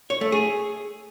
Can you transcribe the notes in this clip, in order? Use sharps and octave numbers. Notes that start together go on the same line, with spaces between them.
C#5
A3
G#4